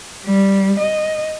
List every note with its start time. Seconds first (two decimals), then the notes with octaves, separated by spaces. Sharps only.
0.25 G3
0.79 D#5